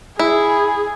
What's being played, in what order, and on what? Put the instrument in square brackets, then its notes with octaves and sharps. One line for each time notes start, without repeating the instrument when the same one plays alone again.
[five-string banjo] E4 [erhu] G#4